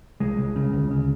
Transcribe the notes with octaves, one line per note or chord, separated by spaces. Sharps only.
C2 G#3
C2
C#3
D2
C#3